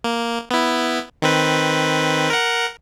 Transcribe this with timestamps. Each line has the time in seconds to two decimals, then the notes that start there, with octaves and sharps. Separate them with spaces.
0.04 A#3
0.51 B3 E4
1.22 D#3 C4 B4
2.30 A#4 F#5